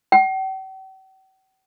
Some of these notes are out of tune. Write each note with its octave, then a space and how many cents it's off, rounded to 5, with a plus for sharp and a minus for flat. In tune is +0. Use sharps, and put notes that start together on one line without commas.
G5 -45